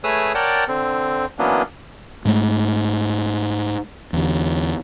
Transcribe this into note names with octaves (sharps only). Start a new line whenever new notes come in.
A3 G#4 B4 C#5 D#6 E6
A#4 C#5 D5 F#5 G5 A5
D3 C4
E3 F#3 A#3 B3 C#4 D4
G#2 G#3 A3
E2 D3